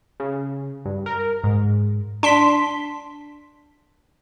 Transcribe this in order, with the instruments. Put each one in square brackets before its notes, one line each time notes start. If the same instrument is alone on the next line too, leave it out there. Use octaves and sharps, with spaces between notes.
[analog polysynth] C#3
G2
A#4
G#2
[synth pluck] D4 C6 B6